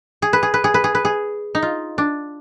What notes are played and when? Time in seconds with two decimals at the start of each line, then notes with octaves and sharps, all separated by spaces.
0.22 G#4
0.33 B4
0.43 G#4
0.54 B4
0.64 G#4
0.74 B4
0.84 G#4
0.95 B4
1.05 G#4
1.55 D#4
1.63 F4
1.98 D4